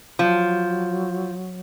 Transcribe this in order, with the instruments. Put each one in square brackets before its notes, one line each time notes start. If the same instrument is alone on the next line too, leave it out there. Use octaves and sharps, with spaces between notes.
[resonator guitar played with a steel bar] F3 [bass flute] F#3